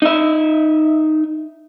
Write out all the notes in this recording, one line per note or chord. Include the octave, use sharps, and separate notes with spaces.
D#4 E5